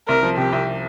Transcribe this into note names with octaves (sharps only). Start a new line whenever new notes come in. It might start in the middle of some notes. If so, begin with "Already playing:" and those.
C2 A#4
F3
C3 G4
C2